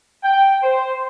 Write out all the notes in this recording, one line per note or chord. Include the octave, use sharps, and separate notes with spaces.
G5
C5